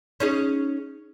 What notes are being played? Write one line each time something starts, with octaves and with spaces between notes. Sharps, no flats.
C#4 D#4 G#4